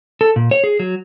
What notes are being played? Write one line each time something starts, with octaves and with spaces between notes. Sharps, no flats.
A4
A#2
C#5
G#4
F#3